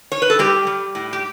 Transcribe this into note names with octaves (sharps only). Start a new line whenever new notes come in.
C#5
B4
A4
G3 G4
G3
A2
G4